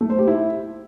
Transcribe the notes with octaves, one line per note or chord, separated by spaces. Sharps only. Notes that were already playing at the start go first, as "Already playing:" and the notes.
A3
C5
G4
E4